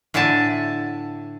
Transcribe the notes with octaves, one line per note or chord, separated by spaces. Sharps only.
A2 D3 E4 G#5 A5